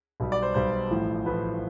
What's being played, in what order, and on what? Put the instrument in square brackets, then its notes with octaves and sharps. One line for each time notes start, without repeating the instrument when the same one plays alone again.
[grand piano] B1 B2 G3
D5
C5
B1 B2 G3 C5
A1 A2 F3
A1 A2 F3 B4